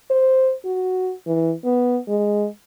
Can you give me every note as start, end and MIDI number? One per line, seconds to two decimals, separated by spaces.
0.10 0.54 72
0.65 1.14 66
1.27 1.53 52
1.65 1.99 59
2.08 2.47 56